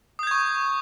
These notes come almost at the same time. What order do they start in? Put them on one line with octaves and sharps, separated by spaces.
D#6 G6 G#6 C#6